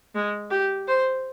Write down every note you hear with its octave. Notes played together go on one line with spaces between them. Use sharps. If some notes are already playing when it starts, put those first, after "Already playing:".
G#3
G4
C5